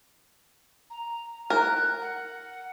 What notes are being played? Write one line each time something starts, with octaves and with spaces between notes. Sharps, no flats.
A#5
A#4 F#6
F#5